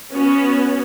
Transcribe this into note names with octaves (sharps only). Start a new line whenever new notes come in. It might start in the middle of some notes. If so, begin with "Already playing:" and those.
B3 C#4 F#4